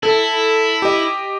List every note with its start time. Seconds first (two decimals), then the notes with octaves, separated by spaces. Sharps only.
0.03 E4 A4
0.82 G4 D#5